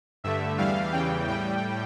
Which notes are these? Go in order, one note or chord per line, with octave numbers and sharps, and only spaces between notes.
G2 D3 A3 E5
E2 E3 G3 F5
E2 C#3 E3 G3 G5
A2 G3 G5